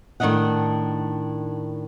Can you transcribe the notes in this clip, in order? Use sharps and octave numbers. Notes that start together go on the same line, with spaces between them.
A2 D#3 B3 D4 D#5 F#5